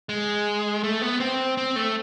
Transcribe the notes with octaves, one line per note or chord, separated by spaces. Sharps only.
G#3
A3
B3
C4
C4
A3